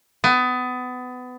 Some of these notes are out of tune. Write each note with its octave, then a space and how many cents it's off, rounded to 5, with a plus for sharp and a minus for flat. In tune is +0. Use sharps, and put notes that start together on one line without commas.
B3 +25